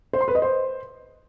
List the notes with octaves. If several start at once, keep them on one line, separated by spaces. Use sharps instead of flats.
C5
C6
B4
D#5
C5